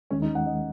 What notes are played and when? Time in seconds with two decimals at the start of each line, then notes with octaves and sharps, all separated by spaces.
0.11 D#2 D#3 G#3 C#4
0.22 D#4
0.35 F#5
0.46 D#5